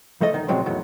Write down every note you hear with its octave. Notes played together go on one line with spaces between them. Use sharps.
F3 A3 A4 D#5
D2 D#3 D#4
A#2 C#3 F3 F#3 G#3 C4
E2 A2 D#3 F#3